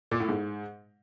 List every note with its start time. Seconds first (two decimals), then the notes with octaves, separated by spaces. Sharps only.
0.11 A#2
0.20 A2
0.29 G#2